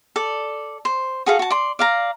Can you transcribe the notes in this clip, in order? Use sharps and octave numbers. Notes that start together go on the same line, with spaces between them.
A4 D5
C5
F#4 G#4 A4 F5
F#4 A5
D5 C6
D5 F5 A#5